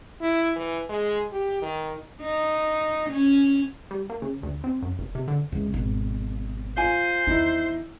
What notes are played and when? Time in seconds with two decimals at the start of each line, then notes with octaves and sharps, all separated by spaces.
0.21 E4
0.56 E3
0.89 G#3
1.32 G4
1.62 D#3
2.22 D#4
3.09 C#4
3.91 G3
4.10 A#3
4.22 C#3
4.43 D2
4.64 C4
4.82 F#2
4.99 F1
5.15 C3
5.28 D3
5.52 C#2 E3
5.74 G#1 B2
6.77 F4 C5 G#5
7.27 E2 D#3 D#4 E4